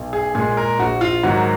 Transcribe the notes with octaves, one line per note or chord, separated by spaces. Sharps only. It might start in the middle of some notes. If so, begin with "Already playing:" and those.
Already playing: B1
G#4
A#2 G#3 G#4
A#4
A#1 F#4
F4
G#2 D#3 F#3 A#3 F#4